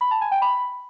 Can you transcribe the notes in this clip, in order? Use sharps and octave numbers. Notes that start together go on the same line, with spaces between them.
B5
A5
G#5
G5
B5